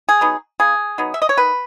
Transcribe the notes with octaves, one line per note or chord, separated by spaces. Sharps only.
G#4
F#3 B3 D#4
C#3 G#4
F#3 B3 D#4
E5
D#5
C#5
D#3 B4